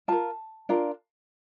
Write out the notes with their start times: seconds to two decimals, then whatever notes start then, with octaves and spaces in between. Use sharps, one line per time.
0.08 F4 A#4 A5
0.69 D4 F4 A#4